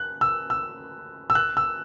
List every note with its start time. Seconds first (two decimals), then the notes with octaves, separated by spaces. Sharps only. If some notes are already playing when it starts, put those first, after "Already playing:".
Already playing: F#6
0.21 E6
0.50 E6
1.30 E6
1.35 F#6
1.57 E6